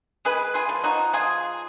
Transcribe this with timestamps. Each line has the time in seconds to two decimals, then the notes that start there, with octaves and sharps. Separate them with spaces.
0.25 G#3 G#4 B4
0.54 F4 G#4
0.69 F3
0.84 D#4 F#4
1.13 F3 F4 G#4